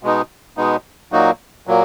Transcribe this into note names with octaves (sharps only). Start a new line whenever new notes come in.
B2 G#3 B3 D#4
B2 G#3 B3 D#4
A#2 F#3 A#3 D#4 F#4
A#2 F#3 A#3